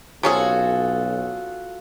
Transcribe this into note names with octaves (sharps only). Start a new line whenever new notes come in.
B1 C3 C#4 F4 F#4 G#4 A4